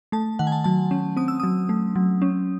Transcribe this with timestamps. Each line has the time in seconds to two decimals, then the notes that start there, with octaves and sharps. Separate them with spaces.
0.12 A3 A5
0.39 D#3 F#5
0.47 G#5
0.52 A5
0.64 F#3 A5
0.91 C#4
1.17 C4 D#6
1.28 E6
1.40 F#3 D#6
1.69 A3
1.96 F#3
2.22 C#4